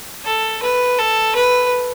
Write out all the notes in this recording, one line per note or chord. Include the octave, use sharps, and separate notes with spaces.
A4
B4
A4
B4